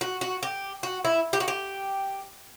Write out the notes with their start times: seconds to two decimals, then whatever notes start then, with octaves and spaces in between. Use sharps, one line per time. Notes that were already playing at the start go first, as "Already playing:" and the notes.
0.01 F#4
0.21 F#4
0.43 G4
0.83 F#4
1.05 E4
1.33 G4
1.40 F#4
1.48 G4